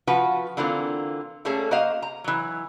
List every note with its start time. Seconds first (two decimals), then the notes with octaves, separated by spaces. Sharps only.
0.07 F3 F4 F#4 B4
0.57 D3 E3 A#3 C4 F4
1.45 G3 A3 A#3 C#4 G#4 A4
1.71 A#3 F#4 C5 D#5 F5
2.02 A#5
2.24 E3 F#3